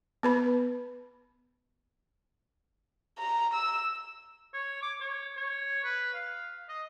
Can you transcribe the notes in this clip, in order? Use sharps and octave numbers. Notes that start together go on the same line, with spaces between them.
B3 B4 B5
A#5
E6
C#5
D6
C#5
C#5
B4
F5
D#5